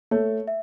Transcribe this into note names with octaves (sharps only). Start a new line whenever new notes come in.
A3 C#5
E5